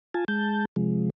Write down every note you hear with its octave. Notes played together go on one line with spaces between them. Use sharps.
F4 G#5 A5
G#3 A5 G6
C3 F3 G#3